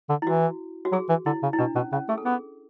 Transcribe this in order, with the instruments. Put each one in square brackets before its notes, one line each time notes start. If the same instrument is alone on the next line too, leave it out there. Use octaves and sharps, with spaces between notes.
[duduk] D3
[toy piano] E4
[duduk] E3 [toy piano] F#4
[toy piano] F#4
[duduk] F#3 [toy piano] G#4
[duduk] E3
[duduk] D3 [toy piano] E4
[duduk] C#3
[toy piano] E4
[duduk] B2 [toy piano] D4
[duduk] B2 [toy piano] C#4
[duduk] C#3 [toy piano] C#4
[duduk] A3 [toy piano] G#4
[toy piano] A4
[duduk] B3 [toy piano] G#4